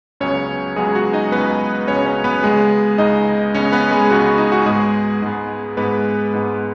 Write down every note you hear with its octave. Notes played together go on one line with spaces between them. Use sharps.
C#2 C#3 F#3 B3 C#4 C#5
C#2 C#3 F#3 G#3 B3 G#4
F#4
D#4 D#5
C#2 C#3 F#3 B3 B4
C#2 C#3 F#3 B3 C#4 C#5
C#4 C#5
B3 B4
C#2 C#3 G#3 B3 G#4
C#2 C#3 B3 D#4 D#5
C#2 C#3 B3 C#4 C#5
B3 B4
G#3 G#4
C#2 C#3 B3 F#4
F#4
D#4
F#4
G#2 G#3 B3 G#4
G#2 G#3 B3
G#2 G#3 B3 B4
G#2 G#3 B3